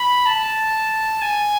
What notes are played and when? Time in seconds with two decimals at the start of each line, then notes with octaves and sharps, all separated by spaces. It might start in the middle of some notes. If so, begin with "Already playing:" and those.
Already playing: B5
0.26 A5
1.22 G#5